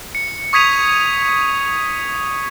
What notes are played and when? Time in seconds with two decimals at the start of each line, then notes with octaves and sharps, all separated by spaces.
0.15 C#7
0.53 C#6 D#6 G#6 B6 D#7 F7